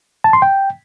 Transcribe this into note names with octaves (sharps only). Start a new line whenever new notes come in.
A5
C6
G5